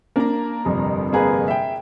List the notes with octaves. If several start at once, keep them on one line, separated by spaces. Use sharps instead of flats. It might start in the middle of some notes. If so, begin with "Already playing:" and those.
A#3 D4 A#4 A#5
G1 F2 C3
A#3 G#4 B4
E5 G5